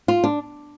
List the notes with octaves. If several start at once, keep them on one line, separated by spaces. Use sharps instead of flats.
F4
D4